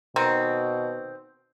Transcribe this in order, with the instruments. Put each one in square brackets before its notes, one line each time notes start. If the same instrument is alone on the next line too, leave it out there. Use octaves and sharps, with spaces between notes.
[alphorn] B2 [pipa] D#3 C4